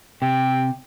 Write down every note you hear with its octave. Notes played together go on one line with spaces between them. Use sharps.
C3 G5